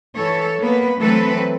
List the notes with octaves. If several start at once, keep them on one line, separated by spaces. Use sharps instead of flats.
E3 A4 C#5
A#3 B3 B4
E3 F#3 A3 C4 A4 B4